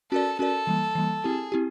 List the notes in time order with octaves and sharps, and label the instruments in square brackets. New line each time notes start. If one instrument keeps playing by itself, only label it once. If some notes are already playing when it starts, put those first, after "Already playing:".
[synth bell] C#4 F#4 A#4 D5 [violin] A4
[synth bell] C#4 F#4 A#4 D5 [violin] A4
[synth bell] E3 G3 A#3
E3 G3 A#3
[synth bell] C4 E4 G4 [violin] G#4
[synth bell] C4 E4 G4